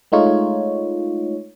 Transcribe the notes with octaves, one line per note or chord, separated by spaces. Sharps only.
G#3 A3 D#4 F4 C#5